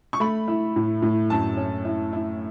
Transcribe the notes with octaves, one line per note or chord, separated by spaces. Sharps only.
C#6
A3 B5
E4
A2
A2
F#2 A5
C#4
E4
E4